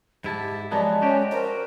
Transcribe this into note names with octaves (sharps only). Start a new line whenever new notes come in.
G#2 E4 G4 A5
F3 F#3 G#3 B3 D5 A5 A#5
C#4 F#4 G4
A#4 C5 A#5